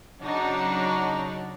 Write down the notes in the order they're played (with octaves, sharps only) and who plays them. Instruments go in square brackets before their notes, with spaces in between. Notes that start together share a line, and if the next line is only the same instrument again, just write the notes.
[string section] C#3 F#3 D4 D#4 F#4